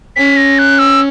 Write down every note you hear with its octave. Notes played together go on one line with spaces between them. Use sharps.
C#4 B6
A#6
F#6
E6